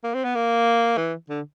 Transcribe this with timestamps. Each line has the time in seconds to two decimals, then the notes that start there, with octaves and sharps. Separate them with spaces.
0.03 A#3
0.14 C4
0.24 B3
0.35 A#3
0.97 E3
1.29 D3